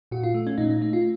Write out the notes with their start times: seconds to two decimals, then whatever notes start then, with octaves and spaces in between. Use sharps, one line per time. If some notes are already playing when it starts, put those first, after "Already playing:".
0.11 A#2 F#4
0.23 F4
0.34 A3
0.47 C#4
0.58 A#2 D#4
0.70 D#4
0.81 A3 D#4
0.93 F4